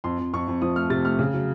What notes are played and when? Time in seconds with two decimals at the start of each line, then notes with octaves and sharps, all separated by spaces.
0.04 F2 C6
0.19 F2
0.33 F2 C#6
0.48 F2
0.62 F3 D#6
0.76 A3 F6
0.90 C3 A6
1.05 A3 F6
1.19 C#3
1.34 F#3